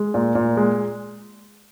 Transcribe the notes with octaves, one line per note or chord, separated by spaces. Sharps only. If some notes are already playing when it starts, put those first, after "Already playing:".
Already playing: G#3
A#2
A#2
G#3